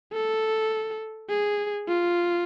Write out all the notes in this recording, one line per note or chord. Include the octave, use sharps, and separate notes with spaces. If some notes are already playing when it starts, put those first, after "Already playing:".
A4
G#4
F4